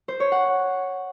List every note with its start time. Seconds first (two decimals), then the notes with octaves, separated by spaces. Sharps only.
0.08 C5
0.20 C#5
0.32 F#5